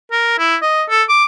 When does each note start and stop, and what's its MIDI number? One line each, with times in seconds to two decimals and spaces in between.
0.12 0.35 70
0.39 0.56 64
0.62 0.84 75
0.89 1.03 69
1.09 1.25 86